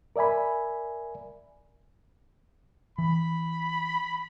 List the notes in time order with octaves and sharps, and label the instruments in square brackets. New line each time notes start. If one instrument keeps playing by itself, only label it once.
[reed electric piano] A#4 D5 E5 G#5 B5
[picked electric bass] E3 [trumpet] B5